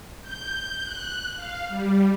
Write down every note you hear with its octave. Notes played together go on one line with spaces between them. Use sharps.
G6
F#6
F5
G3